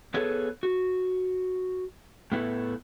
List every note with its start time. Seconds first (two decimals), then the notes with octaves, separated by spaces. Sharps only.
0.14 B3 G#4 A4 B4 C#5
0.63 F#4
2.32 A2 A3 B3 E4 B4